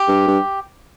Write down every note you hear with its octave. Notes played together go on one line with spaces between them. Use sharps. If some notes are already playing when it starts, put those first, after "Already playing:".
Already playing: G4
G2
G2